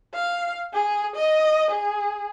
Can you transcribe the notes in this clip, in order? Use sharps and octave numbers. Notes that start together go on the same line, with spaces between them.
F5
G#4
D#5
G#4